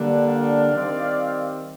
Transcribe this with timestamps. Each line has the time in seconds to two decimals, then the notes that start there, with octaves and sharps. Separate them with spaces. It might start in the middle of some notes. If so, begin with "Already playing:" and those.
Already playing: D3 G3 A#3 D4
0.27 D5 F5
0.71 D#3 G3 C4